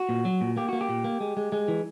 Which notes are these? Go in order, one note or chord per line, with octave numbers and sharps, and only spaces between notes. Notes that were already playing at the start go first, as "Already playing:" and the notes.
Already playing: F#4
A#2
F#3
A#2
A#3 G4
A#3 F#4
G4
A#2
A#3
G#3
G#3
G#3
E3